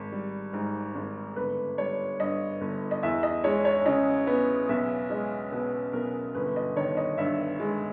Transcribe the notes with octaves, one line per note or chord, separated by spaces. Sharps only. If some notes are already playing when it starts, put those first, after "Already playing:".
Already playing: G#1
G3
G#2
G#1
G1 B4
G3 C#5
G2 D#5
G1
D#5
E2 E5
D#5
G#3 C#5
C#5
C#3 D#5
B3
B1 E5
G#3 D#5
B2 B4
B1 A#4
G1 B4
D#5
D#3 C#5
D#5
G2 E5
G#3